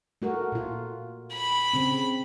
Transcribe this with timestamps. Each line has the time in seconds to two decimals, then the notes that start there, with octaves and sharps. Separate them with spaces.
0.22 A3 F#4 A#4
0.52 A#2 F4
1.33 B5
1.73 C#3 C4